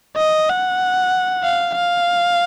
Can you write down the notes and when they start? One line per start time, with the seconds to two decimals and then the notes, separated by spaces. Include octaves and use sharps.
0.17 D#5
0.49 F#5
1.43 F5
1.75 F5